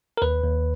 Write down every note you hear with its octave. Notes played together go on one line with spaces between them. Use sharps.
A#4
D#2 B4
D#2